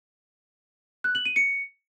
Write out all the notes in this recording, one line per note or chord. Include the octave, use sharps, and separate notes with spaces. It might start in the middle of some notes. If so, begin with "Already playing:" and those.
F#6
F#7
D#7
C#7